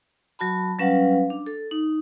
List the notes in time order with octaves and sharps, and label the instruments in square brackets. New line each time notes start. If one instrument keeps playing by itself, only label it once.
[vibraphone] F#3 F#4 A5 B5
F#3 G3 C#4 B4 F5 F#5
D4
A4
D#4